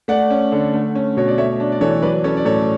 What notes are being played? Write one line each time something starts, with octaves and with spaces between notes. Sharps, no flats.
A3 D5 F#5
C#4
D3
A3
C#4
B2 C#5
D5
A3 C#5 E5
D4
D5
E3 A4 C#5
F#3 B4 D5
C#4 A4 C#5
D5
A2 A4 C#5